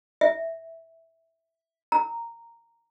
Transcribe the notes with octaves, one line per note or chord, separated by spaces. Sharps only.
E5
A#5